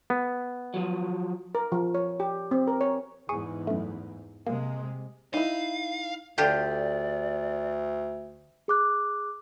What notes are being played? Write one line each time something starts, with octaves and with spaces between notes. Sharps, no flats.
B3
F3 F#3
A#4
F3
C#5
G4
C4
A#4
C#5
E2 G#2 G#4 C#6 D#7
F#2 A3
C3 G#3 A#3
D#4 E4 F5
D2 D3 F4 G4 D5
G#4 D6 F#6